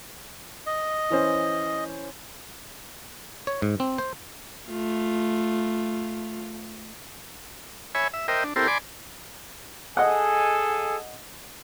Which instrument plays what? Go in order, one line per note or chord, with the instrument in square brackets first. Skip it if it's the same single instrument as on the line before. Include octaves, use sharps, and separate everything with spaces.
[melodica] D#5
[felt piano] E3 C#4 C5
[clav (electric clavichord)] C#5
G#2
C4
C5
[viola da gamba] A3 F4
[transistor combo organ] C#5 E5 G#5 B5
E5
A#4 C5 D#5 E5 G5
D4
C4 E4 G4 A4 A#4 C5
D5 G#5 B5 C6 D6
[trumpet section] G#4 A4 G#5 [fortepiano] D#5 F#5